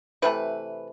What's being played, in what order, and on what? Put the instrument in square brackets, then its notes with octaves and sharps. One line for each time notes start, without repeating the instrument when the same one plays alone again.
[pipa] C3 E3 A3 B4